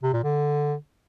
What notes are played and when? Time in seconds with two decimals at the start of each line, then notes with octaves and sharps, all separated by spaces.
0.03 C3
0.13 A#2
0.24 D3